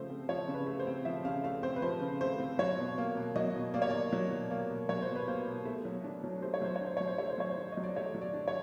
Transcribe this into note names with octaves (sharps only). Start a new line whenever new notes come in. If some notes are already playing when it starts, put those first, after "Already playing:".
Already playing: C#3 F3 A3 C5
C4
F3 C#5
C#3
B4
A3
C5
C4
F3 E5
C#3 F5
A3 F5
C4 C5
B4
F3 C5
C#3
A3 C5
C4
F#3 C#5
B2
A#3
B2
F#3 D#5
B2
A#3 D5
C#5
B2 D5
F#3
B2
A#3
B2
F#3 C#5
C5
B2
B4
A#3 C5
B2
A3
F#3
D4
F#3
A3 C5
C#5
F#3 C5
C#5
D4
C5
F#3 C#5
C5
A3 C#5
C5
F#3 C#5
C5
D4
F#3 D#5
D5
A3 C#5
F#3
D5
D4
C#5